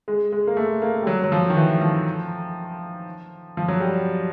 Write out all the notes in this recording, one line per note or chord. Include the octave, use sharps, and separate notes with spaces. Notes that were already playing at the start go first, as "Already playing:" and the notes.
G#3
G#3
A#3
A3
A#3
G3
F#3
F#3
F3
D#3
E3
F3
F3
F#3
G3